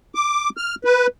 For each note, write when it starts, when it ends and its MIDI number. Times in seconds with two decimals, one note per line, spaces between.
0.15 0.49 86
0.57 0.75 89
0.85 1.07 71